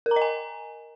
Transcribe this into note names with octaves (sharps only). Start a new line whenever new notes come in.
A#4
A#5
D#5
G#5